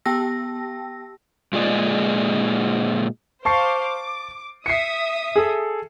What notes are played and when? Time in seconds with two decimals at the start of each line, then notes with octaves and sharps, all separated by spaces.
0.05 B3 G4 G5 A5 E6 A#6
1.53 A#2 G#3 F4 G#4 D5 D#5
3.45 C5 F5 A5 C#6 D6 C7
3.84 D6
4.66 E5 D#6 C7 C#7
5.36 G#4 A4